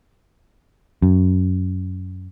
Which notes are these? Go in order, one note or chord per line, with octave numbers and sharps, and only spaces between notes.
F#2